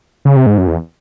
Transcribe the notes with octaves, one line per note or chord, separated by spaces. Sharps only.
C#3
C3
G#2
F#2
E2